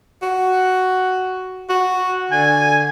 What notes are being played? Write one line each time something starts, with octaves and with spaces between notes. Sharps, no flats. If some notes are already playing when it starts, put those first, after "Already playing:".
F#4
F#4
D3 G#5